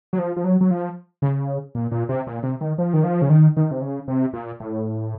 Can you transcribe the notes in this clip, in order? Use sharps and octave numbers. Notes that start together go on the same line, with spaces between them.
F#3
F3
F3
F#3
F#3
F3
C#3
A#2
A#2
C3
A#2
C3
D#3
F3
D#3
F3
C#3
D#3
D#3
C3
C#3
C3
A#2
A2